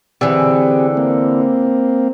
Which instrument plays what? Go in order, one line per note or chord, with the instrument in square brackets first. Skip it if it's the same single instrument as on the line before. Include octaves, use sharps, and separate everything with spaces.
[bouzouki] D3 E3 [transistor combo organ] C4 G4 G#4
[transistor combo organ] A#3 C4